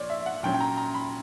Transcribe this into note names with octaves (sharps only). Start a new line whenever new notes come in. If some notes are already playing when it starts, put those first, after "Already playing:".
Already playing: A#2 C#5 D5
E5
F#5
A#2 F#3 C#4 G5
G5
A#5
A#5
B5